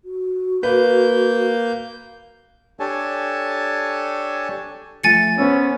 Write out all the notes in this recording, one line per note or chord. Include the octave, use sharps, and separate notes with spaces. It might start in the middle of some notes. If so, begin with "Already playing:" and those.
F#4
A#3 B4 G6
D4 G4 A4 C#5 G#5 A5
F3 A3 G#5 A6 C#7
B3 C#4 C5 E6